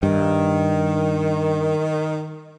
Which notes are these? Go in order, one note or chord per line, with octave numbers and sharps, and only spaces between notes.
G2 D#3